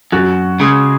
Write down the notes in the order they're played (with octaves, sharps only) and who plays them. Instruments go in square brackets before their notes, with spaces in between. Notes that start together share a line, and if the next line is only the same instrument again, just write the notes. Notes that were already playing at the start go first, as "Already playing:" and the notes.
[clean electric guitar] F#2 [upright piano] F#4
[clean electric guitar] C#3 G#3